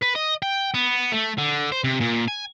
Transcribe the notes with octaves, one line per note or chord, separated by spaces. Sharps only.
B4
D#5
G5
B3
A3
D3
C5
C3
A#2
G#5